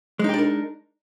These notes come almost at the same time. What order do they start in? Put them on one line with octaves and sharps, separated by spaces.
G#3 D#4 G4 D4 A#4